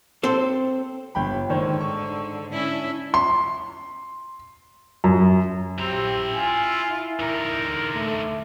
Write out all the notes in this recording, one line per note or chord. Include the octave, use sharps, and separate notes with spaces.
C4 A4 C5
G1 G5 B5
G#2 D3 D#3 C5 C#5
C#6
C#4 D4 E4
C6
F#2
C4 E4 G4 A#5
F4 G#5
E4
D3 D#4 A#4
A3